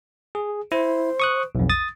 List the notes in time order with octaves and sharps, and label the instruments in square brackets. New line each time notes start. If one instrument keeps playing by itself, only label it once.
[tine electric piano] G#4
[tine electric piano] E4 [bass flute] C5
[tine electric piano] C#6 D#6 F#6
B1 F2
D#6 A6